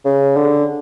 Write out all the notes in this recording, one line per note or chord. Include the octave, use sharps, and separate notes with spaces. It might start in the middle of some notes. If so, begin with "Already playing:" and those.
C#3
D3